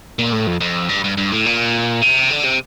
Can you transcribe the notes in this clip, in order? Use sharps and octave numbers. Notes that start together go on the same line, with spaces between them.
A#2
A2
F2
F2
G2
G2
G2
A2
A#2
C3
D3
C3